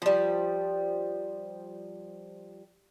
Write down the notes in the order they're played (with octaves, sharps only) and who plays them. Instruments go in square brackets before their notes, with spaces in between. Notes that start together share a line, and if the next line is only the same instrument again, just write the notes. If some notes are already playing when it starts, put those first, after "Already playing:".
[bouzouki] F3 G3